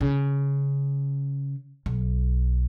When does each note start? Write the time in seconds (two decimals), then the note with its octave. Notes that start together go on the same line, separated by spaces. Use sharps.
0.01 C#3
1.86 B1